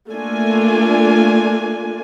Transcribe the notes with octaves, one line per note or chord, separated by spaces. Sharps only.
A3 A#3 D4 F4 G#5